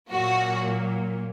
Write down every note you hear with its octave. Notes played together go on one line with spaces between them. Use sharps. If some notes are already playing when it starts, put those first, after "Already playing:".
A#2 F#3 A#3 F#4